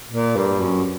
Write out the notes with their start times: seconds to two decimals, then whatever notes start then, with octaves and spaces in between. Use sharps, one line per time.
0.10 A#2
0.36 G2
0.60 F#2